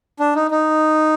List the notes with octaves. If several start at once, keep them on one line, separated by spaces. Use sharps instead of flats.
D4
D#4
D#4